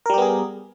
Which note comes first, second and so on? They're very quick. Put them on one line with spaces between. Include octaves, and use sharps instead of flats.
A#4 G3 G4 B3 G#4